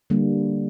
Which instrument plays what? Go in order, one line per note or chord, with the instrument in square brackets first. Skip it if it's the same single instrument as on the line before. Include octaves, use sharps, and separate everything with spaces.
[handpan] D3 G3 A#3